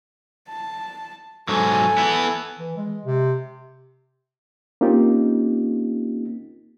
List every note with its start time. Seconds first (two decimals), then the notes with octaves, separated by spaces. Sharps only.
0.49 A5
1.49 G#2 F#3 A4 G#5
1.98 B3 E4
2.59 E3
2.77 G#3
3.05 C3
4.81 A#3 C4 C#4 D#4 F4 G4